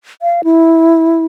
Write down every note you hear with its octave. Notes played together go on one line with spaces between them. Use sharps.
F5
E4